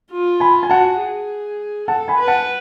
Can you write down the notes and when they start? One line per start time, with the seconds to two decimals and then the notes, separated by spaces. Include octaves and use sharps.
0.11 F4
0.40 G#5 B5
0.63 G#5
0.70 F#4 F#5 A5
1.00 G#4
1.88 A4 F#5 A5
2.08 G#5 B5
2.18 B4
2.27 F#5 A5